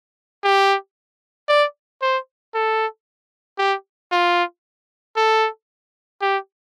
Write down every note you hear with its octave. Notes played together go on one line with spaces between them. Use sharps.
G4
D5
C5
A4
G4
F4
A4
G4